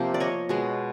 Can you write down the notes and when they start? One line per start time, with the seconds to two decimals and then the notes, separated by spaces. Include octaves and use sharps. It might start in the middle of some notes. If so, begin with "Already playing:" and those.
Already playing: C3 F3 A#3 C5
0.14 D5
0.20 C#5 D#5
0.49 B2 G#3 B3